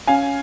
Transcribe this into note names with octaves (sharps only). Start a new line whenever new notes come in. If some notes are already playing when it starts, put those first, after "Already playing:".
C#4 F5 G#5